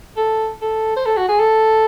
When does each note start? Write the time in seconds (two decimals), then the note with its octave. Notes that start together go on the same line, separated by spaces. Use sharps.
0.17 A4
0.61 A4
0.97 C5
1.06 A4
1.17 F#4
1.28 G#4
1.39 A4